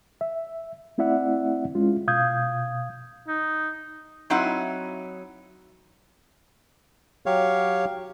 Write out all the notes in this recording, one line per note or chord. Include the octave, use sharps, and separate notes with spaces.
E5
A3 C4 E4 D5 E5 F#5
G#3 C#4 F4
B2 F5 D#6 G6 G#6
D#4
F#3 C4 D#4 E4 F#5
F#3 G4 C#5 F5